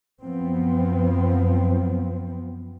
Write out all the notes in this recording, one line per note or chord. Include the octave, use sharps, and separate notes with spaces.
F#2 F3 B3 C4